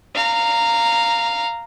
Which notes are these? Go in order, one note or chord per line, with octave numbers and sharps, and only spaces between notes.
F5 A#5